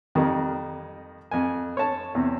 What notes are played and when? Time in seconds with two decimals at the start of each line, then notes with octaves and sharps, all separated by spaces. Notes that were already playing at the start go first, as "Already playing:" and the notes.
0.15 F2 D#3 G3
1.31 F2 G#5
1.77 C#5 A5
2.15 E2 C3